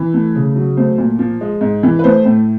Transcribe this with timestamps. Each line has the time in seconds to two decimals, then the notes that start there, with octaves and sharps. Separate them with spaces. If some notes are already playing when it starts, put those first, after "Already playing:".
Already playing: E3
0.14 A3
0.35 C#3
0.56 F#3
0.77 A3 C5
0.98 A#2
1.19 F3
1.41 G#3
1.61 G#2
1.83 E3
1.99 B4
2.04 A3 C5
2.25 A2